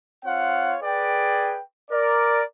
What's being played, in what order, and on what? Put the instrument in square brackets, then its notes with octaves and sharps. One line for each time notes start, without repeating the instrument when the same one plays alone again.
[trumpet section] C4 F4 C#5 F5 F#5
G#4 B4 D5 G5
A#4 D5